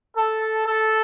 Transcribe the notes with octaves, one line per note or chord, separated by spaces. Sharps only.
A4
A4